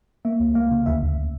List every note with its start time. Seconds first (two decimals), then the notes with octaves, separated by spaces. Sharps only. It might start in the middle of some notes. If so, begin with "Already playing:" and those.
0.25 A#3 E5
0.40 C#2
0.55 A#3 F5
0.71 C#3
0.86 D2 E5
1.03 D2